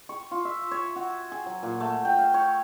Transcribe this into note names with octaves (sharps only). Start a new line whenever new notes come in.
C#6
F4
E5
C#5
F#4
G#4
F#3
A#2
A3
G5
F5
C#5